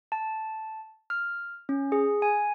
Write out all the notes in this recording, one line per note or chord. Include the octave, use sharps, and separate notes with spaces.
A5
F6
C#4
G#4
G#5